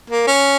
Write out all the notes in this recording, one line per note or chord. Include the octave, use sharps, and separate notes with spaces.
A#3
C#4